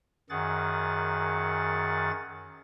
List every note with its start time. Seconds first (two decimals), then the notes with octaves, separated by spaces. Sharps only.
0.30 F#2 D#3 G#4 F#5 A6